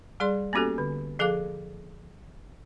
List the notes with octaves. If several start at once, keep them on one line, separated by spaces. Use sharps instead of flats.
G3 G#4 D5 C6
A#3 B3 C#4 F#4 G4 A4
D3
F3 G#4 A4 F5 D6